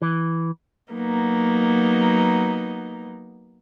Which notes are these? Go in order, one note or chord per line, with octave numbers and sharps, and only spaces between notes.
E3
F#3 A#3 B3 D#4